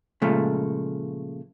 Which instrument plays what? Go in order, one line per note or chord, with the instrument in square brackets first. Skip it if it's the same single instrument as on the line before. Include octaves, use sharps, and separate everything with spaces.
[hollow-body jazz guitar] A#2 C#3 F3 G#3 A3